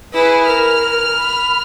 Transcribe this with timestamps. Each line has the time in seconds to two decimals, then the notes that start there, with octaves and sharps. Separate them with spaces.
0.13 E4 G#4 B4
0.47 A#4 F6
1.17 B5